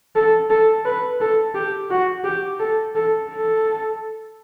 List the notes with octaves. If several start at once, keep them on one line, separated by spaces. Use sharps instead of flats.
A4
A4
B4
A4
G4
F#4
G4
A4
A4
A4